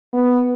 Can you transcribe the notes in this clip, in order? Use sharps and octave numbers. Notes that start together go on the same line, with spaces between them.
B3